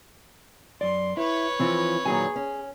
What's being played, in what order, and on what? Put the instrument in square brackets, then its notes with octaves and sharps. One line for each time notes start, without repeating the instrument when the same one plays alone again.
[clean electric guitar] F#2 D5 [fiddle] C6
[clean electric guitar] E4 [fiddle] B4 C#5
[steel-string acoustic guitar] E3 F3 F4 [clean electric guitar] C4
[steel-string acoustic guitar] A#2 D#3 F#3 [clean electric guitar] G#4 G#5
[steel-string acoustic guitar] C#4